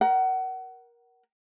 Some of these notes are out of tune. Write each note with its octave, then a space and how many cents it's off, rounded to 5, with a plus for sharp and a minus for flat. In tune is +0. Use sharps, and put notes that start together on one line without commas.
A#4 +20 F#5 +30